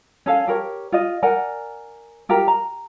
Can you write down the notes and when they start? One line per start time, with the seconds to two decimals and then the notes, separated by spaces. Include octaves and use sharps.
0.26 C#4 A4 F5 G#5
0.47 G4 A#4 C#5
0.92 F4 D#5
1.23 A#4 D5 F#5 G#5
2.29 F4 G4 A#4 A#5
2.48 A#5